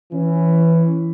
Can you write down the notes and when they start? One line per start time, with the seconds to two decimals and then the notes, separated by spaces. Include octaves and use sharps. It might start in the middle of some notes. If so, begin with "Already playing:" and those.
0.12 E3 C#4